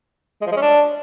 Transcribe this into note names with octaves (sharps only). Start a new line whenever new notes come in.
G#3
F3
G#3
C#4
D4